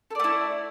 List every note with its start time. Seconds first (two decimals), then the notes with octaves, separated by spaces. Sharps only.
0.11 A4
0.15 D5
0.20 A3
0.24 E4